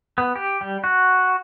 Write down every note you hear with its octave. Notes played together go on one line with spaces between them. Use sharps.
B3
G4
G3
F#4